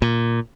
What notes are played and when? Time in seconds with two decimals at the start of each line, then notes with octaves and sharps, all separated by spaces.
0.02 A#2